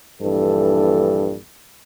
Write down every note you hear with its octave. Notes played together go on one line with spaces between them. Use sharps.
A#1 G2 E3 A4